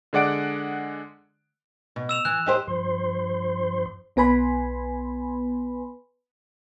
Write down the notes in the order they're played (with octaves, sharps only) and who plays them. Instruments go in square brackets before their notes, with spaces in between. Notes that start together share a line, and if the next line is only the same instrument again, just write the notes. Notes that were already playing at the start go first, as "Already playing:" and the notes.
[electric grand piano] D3 G#3 D5 F#5 D7
[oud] B2
[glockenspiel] E6 E7 F7
[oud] E3 [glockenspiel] F#6
[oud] D#4 G4 C5
[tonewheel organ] G2 F3 C5 C6
[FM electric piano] B1 B3 B4 G#5 B5 C6